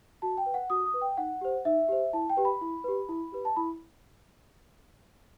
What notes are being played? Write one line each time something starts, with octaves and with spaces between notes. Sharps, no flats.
F#4 A5
G5
B4
F#5
F#4 D#6
D#6
B4
G5
D#4 F#5
G4 C5
D#4 E5
G4 C5
E4 A5
G5
G4 B4
B5
E4
G4 B4
E4
G4 B4
A5
E4 B5